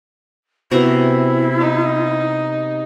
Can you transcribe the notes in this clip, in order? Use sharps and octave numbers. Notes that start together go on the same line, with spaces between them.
C3 B3 E4 F#4 G#5 A#5
D#4